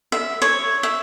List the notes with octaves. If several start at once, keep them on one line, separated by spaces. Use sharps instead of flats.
E5
C#5
E5